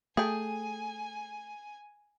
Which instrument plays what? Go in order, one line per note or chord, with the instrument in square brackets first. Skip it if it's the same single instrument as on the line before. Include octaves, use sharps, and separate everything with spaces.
[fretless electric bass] A3 [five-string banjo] G#4 G5 [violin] G#5